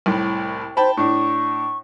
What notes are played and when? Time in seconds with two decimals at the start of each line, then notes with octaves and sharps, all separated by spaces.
0.06 C2 A2
0.77 C5 G5 A5 B5
0.97 A2 D4 C#6